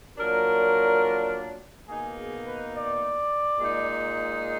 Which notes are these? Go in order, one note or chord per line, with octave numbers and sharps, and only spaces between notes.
A#2 F#3 D4 A#4
B2 A#3 D#4 G#4
G#4
B4
D5
A#2 G#3 D#4